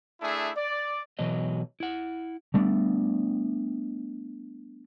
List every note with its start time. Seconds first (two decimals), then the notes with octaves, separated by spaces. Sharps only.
0.21 A3 D4 E4 G#4 E5
0.56 D5
1.19 B2 E3 F#3 D#5
1.80 E4 F#5
2.54 G3 A3 B3 D4